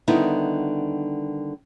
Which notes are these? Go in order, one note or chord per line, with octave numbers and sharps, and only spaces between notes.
D3 D#3 G3 B3 D#4 E4